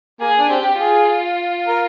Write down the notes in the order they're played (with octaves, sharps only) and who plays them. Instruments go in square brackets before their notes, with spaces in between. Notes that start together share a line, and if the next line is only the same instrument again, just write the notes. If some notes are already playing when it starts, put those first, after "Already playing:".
[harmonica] A#3 [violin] G#4
[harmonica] D4
[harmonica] C4 [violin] G4
[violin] F4 [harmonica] G#4
[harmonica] A#4